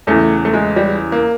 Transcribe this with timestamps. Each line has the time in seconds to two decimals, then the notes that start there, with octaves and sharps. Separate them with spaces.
0.07 E2 C#3 E3 A3
0.45 A3
0.54 G#3
0.76 G3
1.12 A#3